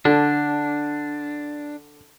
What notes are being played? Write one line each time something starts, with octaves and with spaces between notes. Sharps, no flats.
D3 D4